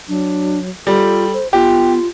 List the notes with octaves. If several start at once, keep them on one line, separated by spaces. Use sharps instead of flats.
F#3 D4
G3 F4 A4
C5
B3 F4 G4